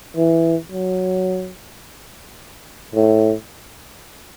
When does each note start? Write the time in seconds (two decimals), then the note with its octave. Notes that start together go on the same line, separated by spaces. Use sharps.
0.17 E3
0.72 F#3
2.95 A2